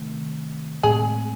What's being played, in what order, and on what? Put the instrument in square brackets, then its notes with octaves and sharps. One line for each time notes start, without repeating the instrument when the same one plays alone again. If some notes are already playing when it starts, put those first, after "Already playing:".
Already playing: [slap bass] C3 D#3 A3
[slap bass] A2 G#3 C4 [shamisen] G#4